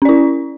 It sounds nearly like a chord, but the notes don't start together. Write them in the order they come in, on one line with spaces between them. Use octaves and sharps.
C#4 D5 E4